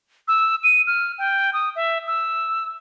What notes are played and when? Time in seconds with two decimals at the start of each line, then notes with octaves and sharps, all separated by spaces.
0.28 E6
0.64 D#7
0.87 F6
1.18 G5
1.53 D#6
1.76 E5
2.07 E6